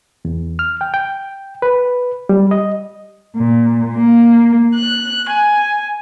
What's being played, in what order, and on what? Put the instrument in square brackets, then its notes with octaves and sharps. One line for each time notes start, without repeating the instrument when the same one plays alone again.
[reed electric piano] E2
F6
G5
G5
B4
G3
D#5
[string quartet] A#2
A#3
F#6
G#5